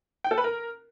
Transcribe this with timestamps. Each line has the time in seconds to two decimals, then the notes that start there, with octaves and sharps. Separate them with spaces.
0.24 G5
0.31 A4
0.38 B4
0.44 A#4